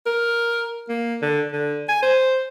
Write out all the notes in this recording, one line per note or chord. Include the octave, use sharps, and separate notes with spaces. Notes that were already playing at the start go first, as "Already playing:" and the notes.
A#4
A#3
D3
D3
G#5
C5